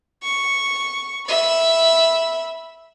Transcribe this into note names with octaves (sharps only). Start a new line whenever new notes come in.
C#6
E5 B5